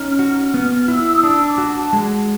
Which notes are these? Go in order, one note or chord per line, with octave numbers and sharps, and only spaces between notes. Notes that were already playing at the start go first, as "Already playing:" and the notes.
Already playing: C#4 D#4 F6
F#4
B3 F6
E4 E6
D#6
D4 E6
D6
F#4
A5
G#3